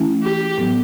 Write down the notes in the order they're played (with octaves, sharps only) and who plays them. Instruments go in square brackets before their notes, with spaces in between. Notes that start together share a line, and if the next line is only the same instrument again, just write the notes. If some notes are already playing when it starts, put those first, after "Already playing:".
Already playing: [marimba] E3 A3 C#4 E4
[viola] G4
[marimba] A2 F#3 B3